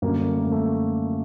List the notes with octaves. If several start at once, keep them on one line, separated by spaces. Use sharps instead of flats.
F#2 D3 G3 A#3
A3
A#3
A3